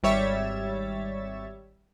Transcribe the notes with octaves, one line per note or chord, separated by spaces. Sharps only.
G#1 G3 C#5 E5 A6